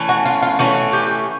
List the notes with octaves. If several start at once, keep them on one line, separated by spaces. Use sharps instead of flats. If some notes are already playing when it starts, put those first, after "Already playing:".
Already playing: E3 A3 C#4
F#4
F4
F4
E3 A3 C#4 F#4
G4